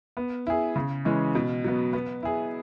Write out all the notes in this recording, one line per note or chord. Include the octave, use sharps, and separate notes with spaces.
B3
E4 G#4
C#3
E3 G#3 C#4
B2
F#3 B3
B3
E4 G#4